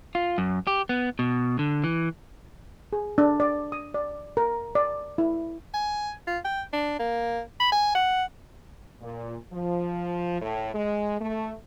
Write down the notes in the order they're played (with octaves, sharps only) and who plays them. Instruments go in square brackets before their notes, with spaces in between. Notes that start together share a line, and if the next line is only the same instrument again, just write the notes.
[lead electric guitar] F4
F#2
G4
B3
B2
D3
E3
[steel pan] G#4
D4
D5
D#6
D5
A#4
D5
E4
[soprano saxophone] G#5
F4
G5
D4
A#3
B5
G#5
F#5
[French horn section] A#2
F3
A2
G#3
A3